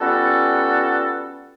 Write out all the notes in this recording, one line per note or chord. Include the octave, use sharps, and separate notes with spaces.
G3 B3 C#4 F4 F#4 A4